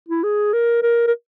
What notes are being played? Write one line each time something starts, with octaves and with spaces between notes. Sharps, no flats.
E4
G#4
A#4
A#4
A#4